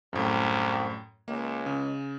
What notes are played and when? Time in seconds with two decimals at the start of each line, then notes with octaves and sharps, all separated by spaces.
0.13 C2 F#2 A2
1.28 C#2 A#3
1.66 C#3